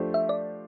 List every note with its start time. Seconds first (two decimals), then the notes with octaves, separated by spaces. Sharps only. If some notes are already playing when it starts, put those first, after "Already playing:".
Already playing: F3 A3 D4 G4 C5
0.14 E5
0.29 D5